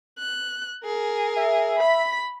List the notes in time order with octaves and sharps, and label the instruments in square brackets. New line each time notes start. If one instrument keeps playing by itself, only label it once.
[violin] F#6
G#4 A#4
[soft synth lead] E5
[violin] B5 B6